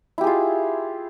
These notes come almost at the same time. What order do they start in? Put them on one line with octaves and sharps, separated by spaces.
E4 G4 G#4 F4